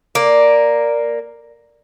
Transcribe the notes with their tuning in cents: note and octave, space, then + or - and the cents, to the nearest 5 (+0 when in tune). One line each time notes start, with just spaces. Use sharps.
A#3 +0 D5 +0